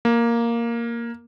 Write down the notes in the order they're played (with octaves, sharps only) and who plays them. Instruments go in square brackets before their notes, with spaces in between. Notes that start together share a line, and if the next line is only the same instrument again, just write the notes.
[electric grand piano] A#3